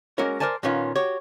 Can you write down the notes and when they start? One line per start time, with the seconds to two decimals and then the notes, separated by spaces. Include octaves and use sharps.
0.18 G#3 A#3 C#4 F#4 A#4 C#5
0.40 A#4 C5 D5 G#5 A5
0.63 A#2 D#3 B3 C#4 F4
0.95 F#4 G4 C#5